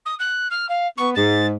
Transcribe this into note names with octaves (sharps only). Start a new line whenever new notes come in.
D#6
F#6
F6
F5
B3 C#6
G#2 A6